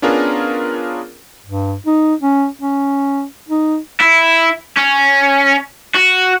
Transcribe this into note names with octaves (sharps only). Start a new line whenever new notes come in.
B3 C#4 D4 F4 G#4 A#4
G2
D#4
C#4
C#4
D#4
E4
C#4
F#4